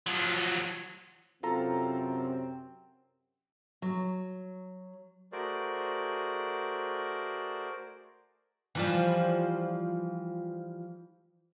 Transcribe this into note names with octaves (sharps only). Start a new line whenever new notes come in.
F3 F#3
F#2 C3 C4 F4 A4 A#5
F#3
A3 F#4 G#4 A#4 C5 D5
E3 F3 G3